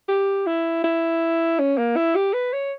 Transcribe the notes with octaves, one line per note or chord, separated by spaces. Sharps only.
G4
E4
E4
C#4
A#3
E4
G4
B4
C#5